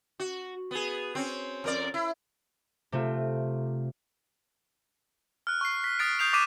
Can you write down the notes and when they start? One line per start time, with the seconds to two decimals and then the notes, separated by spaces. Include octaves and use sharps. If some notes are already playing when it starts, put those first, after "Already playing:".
0.20 F#4
0.71 B3 G#4
1.15 C4 C#4
1.64 F2 A#4 D5
1.94 E4
2.92 C3 A3 C4 F4
5.47 F6 F#6
5.61 C#6 C7
5.84 B6
5.99 D#6 F#6 A6 B6 D7
6.19 D#6 G6 C7 F7
6.33 D6 F#6 A6 B6 D#7 E7